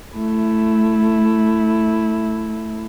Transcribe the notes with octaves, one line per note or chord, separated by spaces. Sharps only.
A3 E4